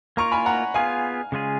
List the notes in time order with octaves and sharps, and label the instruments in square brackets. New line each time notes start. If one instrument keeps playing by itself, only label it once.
[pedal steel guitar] A#3 F4 A#4 [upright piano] A#5 C#6
[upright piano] G#5 B5
F#5 A#5
[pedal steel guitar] B3 F4 G#4 [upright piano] F5 G#5
[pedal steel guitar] C#3 G#3 C#4 F4 G#4